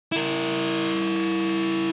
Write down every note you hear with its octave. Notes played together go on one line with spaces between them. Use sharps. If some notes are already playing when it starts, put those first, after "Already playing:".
E4 A#4